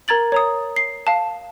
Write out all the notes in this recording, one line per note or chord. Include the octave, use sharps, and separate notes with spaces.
A#4 A#5 G#6 A6 F#7
C#5 A#5 D#6
C7
F5 A5